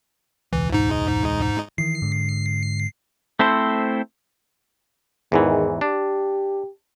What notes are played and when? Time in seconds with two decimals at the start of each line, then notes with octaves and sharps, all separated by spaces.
0.53 E1 C#2 E3
0.73 G#2 D#4
1.78 D#3 E3 C7
2.02 G#2 D3
3.39 A3 C4 E4 A4 C5
5.32 E2 G#2 D#3 E3
5.81 D4 G4